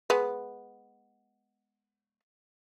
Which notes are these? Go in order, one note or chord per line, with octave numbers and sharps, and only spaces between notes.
G#3 B3